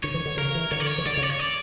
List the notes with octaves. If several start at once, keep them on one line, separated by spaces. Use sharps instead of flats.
D3 C#5
E3
D3
C#3 A#4
E3
D3 C#5
D5
C#5
E3
D3 D5
C#3 C#5
D5
C#5
D5